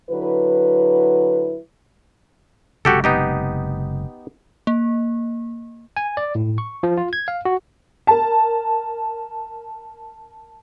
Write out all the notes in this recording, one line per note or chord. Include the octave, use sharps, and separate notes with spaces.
D3 F#3 E4 B4
F#1 C3 G#3 F#4 G4 A4
B3 D#4 G4
A#3
G#5
D5
A2
C#6
F3
F4
G#6
F5
F#4
A#4 A5